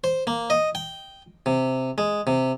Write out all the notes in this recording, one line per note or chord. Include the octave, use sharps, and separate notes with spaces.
C5
A#3
D#5
G5
C3
G#3
C3